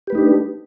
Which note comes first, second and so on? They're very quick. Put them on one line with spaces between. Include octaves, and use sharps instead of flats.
G4 B4 A3 D#4 D4